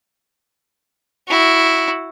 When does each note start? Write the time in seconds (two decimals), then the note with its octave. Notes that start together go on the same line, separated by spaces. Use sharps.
1.29 E4 F#4